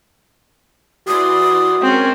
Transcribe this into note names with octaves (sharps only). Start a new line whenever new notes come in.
E3 F#4 D5 C6 D#6
G#3 C4 C#4 A#4